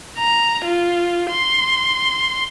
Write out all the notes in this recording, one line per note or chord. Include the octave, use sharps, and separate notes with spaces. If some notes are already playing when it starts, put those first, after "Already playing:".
A#5
F4
C6